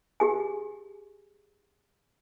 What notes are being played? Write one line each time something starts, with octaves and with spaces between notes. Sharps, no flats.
G4 G#4 G#5